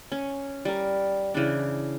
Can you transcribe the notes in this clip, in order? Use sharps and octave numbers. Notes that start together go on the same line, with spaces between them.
C#4
G3 A#4
C#3 E3 D4